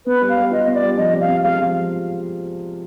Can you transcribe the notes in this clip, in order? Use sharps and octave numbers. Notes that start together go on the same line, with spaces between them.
B3 B4
G3
F5
G3
F4 D#5
B3
D5
G3
F3 D#5
C3
F5
C3
G#3 F5
F3